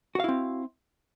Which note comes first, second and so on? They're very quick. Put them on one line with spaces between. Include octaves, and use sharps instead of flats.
F#4 F5 E4 C4